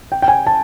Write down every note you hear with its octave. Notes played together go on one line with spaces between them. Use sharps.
G5
G5
G#5
A5